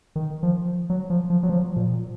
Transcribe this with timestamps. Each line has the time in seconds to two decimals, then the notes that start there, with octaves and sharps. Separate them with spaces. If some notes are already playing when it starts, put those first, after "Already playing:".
0.16 D#3
0.43 F3
0.90 F#3
1.10 F3
1.30 F3
1.43 F#3
1.49 F3
1.76 A#2